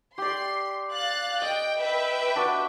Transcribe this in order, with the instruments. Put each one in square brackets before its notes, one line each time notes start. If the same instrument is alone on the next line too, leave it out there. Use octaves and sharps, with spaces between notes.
[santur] G4 D5 [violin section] C6
[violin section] F5 F#6 A6
[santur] D#5 [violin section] G5
[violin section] B4 E5 G5
[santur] D4 F#4